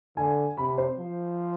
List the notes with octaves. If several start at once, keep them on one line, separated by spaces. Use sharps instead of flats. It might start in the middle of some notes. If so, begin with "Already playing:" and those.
D3 G#5
C3 B5
C5
F3